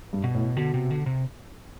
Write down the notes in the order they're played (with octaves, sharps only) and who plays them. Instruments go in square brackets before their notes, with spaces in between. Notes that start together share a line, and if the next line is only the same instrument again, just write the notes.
[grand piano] G2
[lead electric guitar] B2
[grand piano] A2
[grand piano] B2 [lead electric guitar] D3
[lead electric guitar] C3
D3
C3